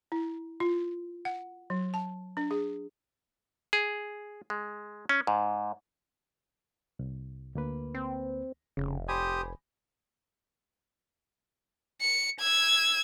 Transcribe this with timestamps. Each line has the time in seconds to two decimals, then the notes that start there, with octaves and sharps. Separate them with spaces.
0.12 E4
0.60 F4
1.25 F#5
1.70 F#3
1.94 A5
2.37 D4
2.51 G#4
3.73 G#4
4.50 G#3
5.09 C#4
5.27 G#2
6.99 C2
7.55 D2 A#3 B4
7.94 C4
8.77 F1 C#3
9.09 G4 C5 G#5 B5 D#6
12.01 C#7
12.40 E6 G#6